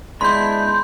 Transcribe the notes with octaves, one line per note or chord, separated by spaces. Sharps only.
G#3 B3 D4 E4 B5 C6 G6